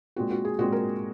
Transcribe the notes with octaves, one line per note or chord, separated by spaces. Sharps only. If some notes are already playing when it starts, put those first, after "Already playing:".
A#2 G#3 C4 F#4
F#4
G#4
A#2 G#3 C4 F#4
A#4